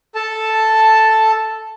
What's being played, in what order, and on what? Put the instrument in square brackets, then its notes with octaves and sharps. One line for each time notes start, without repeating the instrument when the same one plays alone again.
[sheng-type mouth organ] A4 A5